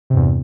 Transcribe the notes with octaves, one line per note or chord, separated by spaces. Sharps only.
E2 G2 C3